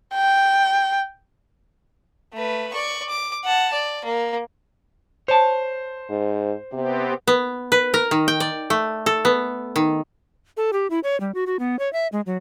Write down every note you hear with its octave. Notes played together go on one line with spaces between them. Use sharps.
G5
A3 B4
D5 C#6
D6
F#5 A5
D5
A#3
C5 C#5 A5
G#2
C3 B3 C4 G4
B3
B4
A#4
D#3
G5
D5
A3
A4
B3
D#3
A4
G4
E4
C#5
G3
F#4
F#4
B3
C#5
E5
G#3
F#3